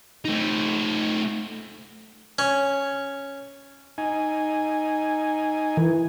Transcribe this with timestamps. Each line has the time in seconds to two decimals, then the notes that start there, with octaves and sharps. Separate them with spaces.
0.25 A3 D#4
2.39 C#4
3.98 D#4 G#5
5.77 E3